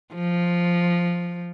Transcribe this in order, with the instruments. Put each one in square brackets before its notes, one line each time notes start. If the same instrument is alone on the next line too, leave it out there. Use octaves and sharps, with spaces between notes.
[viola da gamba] F3